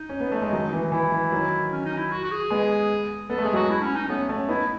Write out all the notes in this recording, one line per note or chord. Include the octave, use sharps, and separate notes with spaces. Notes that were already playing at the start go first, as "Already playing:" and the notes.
Already playing: D#4
C#4
B3
A3
G#3
D#3 F#3
E3
E3 E4
E3
D#3 F#3
C#4
D#4
E4
F#4
F#4
G#4
G#3 B3
B3 A4
A3
G#3 G#4
F#3 A3 F#4
E4
C#4
D#4
A3 B3 C#4
A3 C#4
B3 D#4 E4